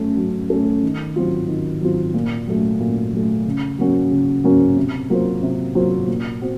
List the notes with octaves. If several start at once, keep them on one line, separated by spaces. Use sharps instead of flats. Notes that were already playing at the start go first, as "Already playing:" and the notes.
Already playing: F#3 A3 C#4 A4
F#3
A3 C#4 A4
D#3
F#3 C4 F4
D#3
F#3 C4 F4
A#2
F#3 A3
A#2
F#3 A3
C#3
F#3 A#3 C#4 F#4
C#3
F#3 A#3 C#4 F#4
C3
F#3 A#3 F4 C5
C3
F#3 A#3 F4 C5
A#2
C4 F#4